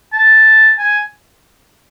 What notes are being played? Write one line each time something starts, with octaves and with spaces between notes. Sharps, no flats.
A5
G#5